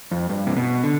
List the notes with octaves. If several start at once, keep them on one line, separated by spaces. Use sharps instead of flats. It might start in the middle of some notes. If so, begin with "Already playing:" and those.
F2
G2
C3
B2
D3